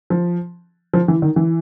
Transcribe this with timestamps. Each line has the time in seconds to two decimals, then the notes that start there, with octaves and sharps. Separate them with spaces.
0.10 F3
0.94 F3
1.08 E3
1.22 D#3
1.36 E3